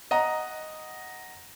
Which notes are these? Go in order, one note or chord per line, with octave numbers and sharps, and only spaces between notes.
D#5 F#5 A#5